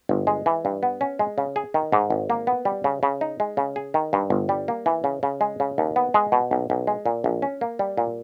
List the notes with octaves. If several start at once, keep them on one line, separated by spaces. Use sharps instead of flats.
G1
G#3
E3
G2
B3
C#4
G#3
C#3
G#4
D#3
G#2
G#1
A#3
B3
G3
C#3
C#3
D#4
G#3
C#3
G#4
D#3
G2
G1
G3
A#3
E3
C#3
C#3
G#3
C#3
D#2
B3
G#3
B2
B1
B1
G#3
A#2
A#1
C#4
A#3
G3
A#2